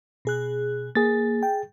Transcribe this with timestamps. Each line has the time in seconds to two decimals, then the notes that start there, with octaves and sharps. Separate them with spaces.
0.25 B2 G#4 F#6
0.95 A#3 G#4 A6
1.43 G5